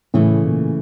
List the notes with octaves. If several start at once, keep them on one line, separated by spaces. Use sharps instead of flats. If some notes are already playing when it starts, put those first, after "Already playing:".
A2 C#3 E3 A3
A#2